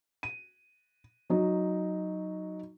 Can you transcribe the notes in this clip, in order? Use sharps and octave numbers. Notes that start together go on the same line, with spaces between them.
D#7
F#3 D#4